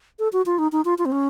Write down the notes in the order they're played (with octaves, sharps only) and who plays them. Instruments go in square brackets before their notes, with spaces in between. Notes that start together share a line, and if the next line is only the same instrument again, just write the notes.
[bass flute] A4
F#4
F4
D#4
D#4
F4
F4
C4
C#4